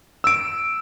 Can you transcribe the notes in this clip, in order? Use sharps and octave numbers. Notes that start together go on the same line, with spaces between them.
E6 D7